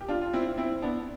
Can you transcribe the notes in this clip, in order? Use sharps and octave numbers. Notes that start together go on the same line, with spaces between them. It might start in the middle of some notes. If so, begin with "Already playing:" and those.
G4
D4 F4
F4
C4 E4
C4 E4
B3 D4